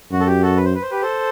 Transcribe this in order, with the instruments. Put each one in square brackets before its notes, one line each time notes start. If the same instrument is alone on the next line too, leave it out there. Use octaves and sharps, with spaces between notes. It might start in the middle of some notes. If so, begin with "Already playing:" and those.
[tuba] F#2 [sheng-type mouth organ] F#4
[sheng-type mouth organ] A4
G4
F#4 A4
B4
C5
B4
C5
G4 B4
A4 C5